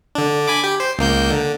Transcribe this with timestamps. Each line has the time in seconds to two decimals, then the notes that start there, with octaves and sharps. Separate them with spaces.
0.15 D3 D4
0.48 G#5 B5 D6
0.64 G4
0.80 C5
0.99 C#2 A#3 G6
1.30 D3